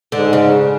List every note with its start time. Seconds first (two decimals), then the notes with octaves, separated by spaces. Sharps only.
0.12 G#2 D3
0.33 C#3